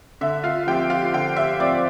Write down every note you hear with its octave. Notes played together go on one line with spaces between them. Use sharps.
D3 E5
F4 F5
F3 C4 G4 G5
F4 F5
D3 G4 G5
E5
F3 C4 D5 D6